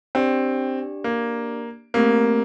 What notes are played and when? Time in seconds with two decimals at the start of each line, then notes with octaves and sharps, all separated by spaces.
0.15 C4 D4 G4 D5
1.04 A#3
1.94 A3 A#3 C4 G4 A#4